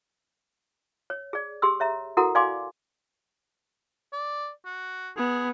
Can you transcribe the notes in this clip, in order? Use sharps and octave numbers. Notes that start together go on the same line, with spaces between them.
C#5
G#4 D5
G4 G#4 C6 E6
C#5 E5 A#5
E4 F#4 A4 A#4 F#5 A#5
D5 F5 G#5 C6 D6
D5
F#4
B3 G#4